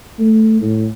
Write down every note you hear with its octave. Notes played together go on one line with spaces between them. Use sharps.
A3
A2